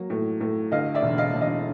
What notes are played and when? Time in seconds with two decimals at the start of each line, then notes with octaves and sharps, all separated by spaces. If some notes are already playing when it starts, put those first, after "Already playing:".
Already playing: F#3 A#3
0.10 A2
0.41 A2
0.72 D2 D#5 F5
0.94 D5 E5
1.02 E1
1.18 D#5 F5
1.33 E1
1.41 D#5 F5